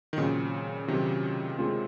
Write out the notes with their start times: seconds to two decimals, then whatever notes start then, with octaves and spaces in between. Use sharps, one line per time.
0.13 D#3
0.18 A#2 C#3 F#3 C4 F#4
0.88 C3 D#3 F#3 C4 F#4
1.58 G#3 C4 F4 G#4